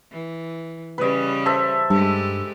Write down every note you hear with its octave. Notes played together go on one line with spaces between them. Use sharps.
E3
C#3 G3 C#4 B4 D#5
A4 C5 E5
G2 G#3 G4 A4